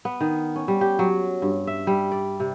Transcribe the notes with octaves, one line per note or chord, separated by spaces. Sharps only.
B3
D#3
C#4
G3
G4
F#3
G2
E5
G3
D5
C3